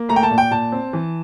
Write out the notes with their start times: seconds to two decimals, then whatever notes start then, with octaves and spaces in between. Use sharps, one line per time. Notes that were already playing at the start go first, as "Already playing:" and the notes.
Already playing: A#3
0.09 A3 A#5
0.16 G5
0.23 A5
0.31 A#2
0.38 G5
0.51 A#2 A5
0.72 C4
0.93 E3